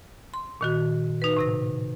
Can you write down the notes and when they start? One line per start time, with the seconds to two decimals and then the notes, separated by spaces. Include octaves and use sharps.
0.34 C6
0.61 A#2 D#3 F#4
1.22 D#4 B4
1.37 A2 C3 A#6